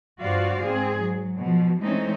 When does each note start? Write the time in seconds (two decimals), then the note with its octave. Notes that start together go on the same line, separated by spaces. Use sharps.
0.21 G2 F4 F#4 C5 D5 F5
0.62 G#2 C4 G#4
1.01 F#3
1.39 B2 F3
1.81 E3 G#3 A3 C4 C#4 D#4